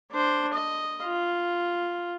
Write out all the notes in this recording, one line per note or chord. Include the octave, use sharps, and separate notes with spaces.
D4 C5
D#5
F4